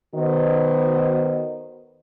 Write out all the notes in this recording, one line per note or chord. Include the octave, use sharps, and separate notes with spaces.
D#3 B3 F#4 C5 D#5